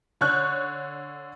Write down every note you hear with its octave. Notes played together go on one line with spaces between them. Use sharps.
D3 C#5 C#6 F#6 G6